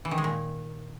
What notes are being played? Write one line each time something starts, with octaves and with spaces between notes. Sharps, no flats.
E3
D#3
G#3
A#2